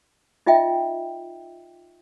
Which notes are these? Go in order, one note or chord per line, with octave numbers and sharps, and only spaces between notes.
D#4 F4 D#5 E5 G5